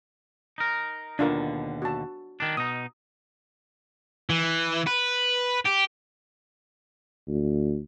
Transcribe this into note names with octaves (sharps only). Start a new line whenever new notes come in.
D#4 A#4
D#2 B2 D3 D4 F4 A#4
F#4 A5
D#3 D4
B2 D#4 A#5 D#6
E3
B4
G4
D2